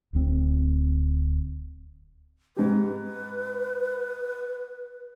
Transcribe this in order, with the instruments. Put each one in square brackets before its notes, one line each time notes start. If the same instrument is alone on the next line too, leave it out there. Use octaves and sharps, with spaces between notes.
[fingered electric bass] D1 D2 C4
[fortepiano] G#2 G4 [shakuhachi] B4